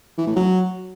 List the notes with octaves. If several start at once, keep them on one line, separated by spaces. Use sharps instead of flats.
E3
A2
F#3